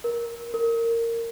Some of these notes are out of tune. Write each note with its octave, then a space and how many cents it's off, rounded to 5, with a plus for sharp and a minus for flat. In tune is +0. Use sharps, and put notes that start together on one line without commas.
A#4 +10
A#4 -15